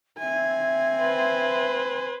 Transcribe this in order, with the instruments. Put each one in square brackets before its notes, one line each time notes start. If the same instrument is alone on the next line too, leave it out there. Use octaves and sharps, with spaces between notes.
[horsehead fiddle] C4 G#5 [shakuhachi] E5
[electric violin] B4 C5